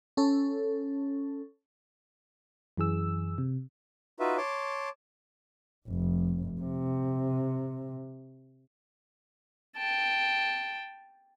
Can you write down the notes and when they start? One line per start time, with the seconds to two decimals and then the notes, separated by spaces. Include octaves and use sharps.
0.17 C#4 A4
2.77 F#2 E3 G#4 E6
3.38 C3
4.20 D#4 F4 F#4 B4 E5
4.37 C#5 A5 C6 D6
5.87 F1
6.61 C3
9.77 G5 A5